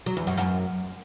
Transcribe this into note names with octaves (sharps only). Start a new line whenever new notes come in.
F#3
E2
F#2
F#2